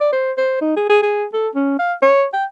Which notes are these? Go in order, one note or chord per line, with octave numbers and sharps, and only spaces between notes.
D5
C5
C5
D#4
G#4
G#4
G#4
A4
C#4
F5
C#5
G5